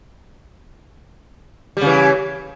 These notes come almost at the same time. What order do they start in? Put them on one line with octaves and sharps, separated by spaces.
G3 C#3 E3